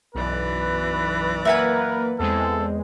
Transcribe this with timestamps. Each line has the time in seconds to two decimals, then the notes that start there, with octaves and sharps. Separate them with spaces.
0.15 B1 F#2 E3 B4 D5
1.45 A#3 A#4 B4 E5 F#5 G#5
2.19 E2 G#3 C4 A4